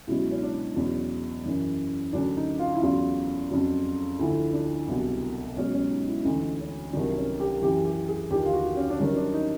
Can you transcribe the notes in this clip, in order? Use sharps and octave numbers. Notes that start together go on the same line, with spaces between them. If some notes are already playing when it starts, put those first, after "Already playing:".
C#2 B2 F#3 E4
C#4
D4
E2 B2 F#3 C#4
F#2 C#3 E3
D2 C#3 F#3 D4
D#4
F4
E4
E2 C#3 F#3 F4
F2 C#3 F#3
D2 D3 F3 E4
D4
C2 B2 F#3
C#2 B2 F#3 C#4
C#4
D#4
E4
D2 C#3 E3 D#4
C#4
C2 C3 D#3 F#3 D4
C#4
G4
F#2 C#3 E3 G4
G4
G#4
D#2 D3 F3 G4
F4
F#4
C#4
D4
G2 D#3 F#3 C#4
D4
D#4